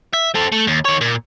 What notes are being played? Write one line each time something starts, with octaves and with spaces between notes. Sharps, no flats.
E5
C4 A4
A3
D#2
D#3 C#5
A#2